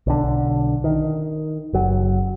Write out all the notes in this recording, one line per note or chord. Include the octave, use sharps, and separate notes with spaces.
B1 D3
D#3
F#1 F#3